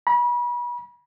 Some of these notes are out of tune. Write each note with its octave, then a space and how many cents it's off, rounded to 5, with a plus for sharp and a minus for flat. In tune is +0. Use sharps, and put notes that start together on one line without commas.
B5 -35